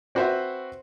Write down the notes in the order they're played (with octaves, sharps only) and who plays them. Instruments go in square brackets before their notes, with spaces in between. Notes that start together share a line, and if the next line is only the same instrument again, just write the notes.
[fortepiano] C4 F#4 B4 C5 E5 F#5